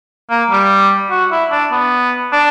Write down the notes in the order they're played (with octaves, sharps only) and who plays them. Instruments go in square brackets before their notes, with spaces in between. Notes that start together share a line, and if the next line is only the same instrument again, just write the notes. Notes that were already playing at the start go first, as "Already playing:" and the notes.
[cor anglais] A#3
G3
F#4
E4
D4
B3
D4